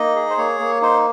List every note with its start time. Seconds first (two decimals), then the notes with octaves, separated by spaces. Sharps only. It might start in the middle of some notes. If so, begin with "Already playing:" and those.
Already playing: A#3 D#4 D#5
0.16 G#4
0.30 C5
0.38 A#3 C#5
0.60 A#3
0.82 D#4 C5